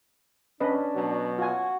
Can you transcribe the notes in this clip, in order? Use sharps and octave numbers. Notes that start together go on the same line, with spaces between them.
C#4 D4 B4 D#5
B2 F#3
F4 F#4 G#5